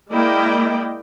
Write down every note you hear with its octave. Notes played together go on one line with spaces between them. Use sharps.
G#3 A#3 E4 D5 D#5 G5